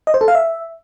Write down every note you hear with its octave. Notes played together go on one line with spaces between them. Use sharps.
D#5
C5
A4
F5
E5